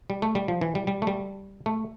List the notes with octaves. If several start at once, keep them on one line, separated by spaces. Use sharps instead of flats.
G3
A3
G3
F3
E3
G3
G3
A3
G3
A3